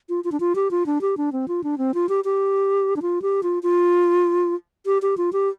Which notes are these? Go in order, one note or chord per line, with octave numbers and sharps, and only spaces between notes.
F4
F4
D4
F4
G4
F4
D4
G4
D4
C4
F4
D4
C4
F4
G4
G4
D4
F4
G4
F4
F4
G4
G4
F4
G4